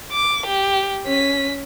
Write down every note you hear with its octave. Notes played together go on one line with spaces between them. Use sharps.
D6
G4
C#4 B6